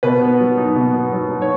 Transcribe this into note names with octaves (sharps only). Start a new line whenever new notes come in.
B2 B4
B3
F#3
D#4
B2
B3
F#3
D#4
C#5